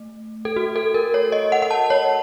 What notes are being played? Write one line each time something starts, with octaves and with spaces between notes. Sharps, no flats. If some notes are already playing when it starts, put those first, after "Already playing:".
Already playing: A3
A4
F#4
A4
A#4
C#5
D#5
F#5
F#5
A5
C#5